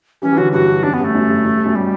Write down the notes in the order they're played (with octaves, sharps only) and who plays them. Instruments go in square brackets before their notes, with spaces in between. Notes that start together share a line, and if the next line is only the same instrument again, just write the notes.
[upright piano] E3 G3 [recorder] C#4
[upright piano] E3
[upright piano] D3 F#3 [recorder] F#4
[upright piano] G2 [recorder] F#4
[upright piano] F#2 [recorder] D4
[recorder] B3
[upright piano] G2
[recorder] A3
[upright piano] F#2
G2
F#2
G2
F#2 A2
[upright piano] B2 [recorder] G3